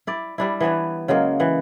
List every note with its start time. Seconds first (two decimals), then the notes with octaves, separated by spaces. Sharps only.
0.07 E4 D5
0.38 G3 D4 E4
0.61 E3 B3 D4 C#5
1.08 C#3 F#3 G#3 A#3
1.40 E3 F#5